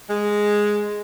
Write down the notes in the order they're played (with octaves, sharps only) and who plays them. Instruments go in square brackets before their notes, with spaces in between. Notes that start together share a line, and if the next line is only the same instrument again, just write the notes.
[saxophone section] G#3